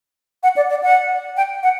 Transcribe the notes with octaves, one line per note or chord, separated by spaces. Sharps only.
F#5
D5
D5
F#5
G5
F#5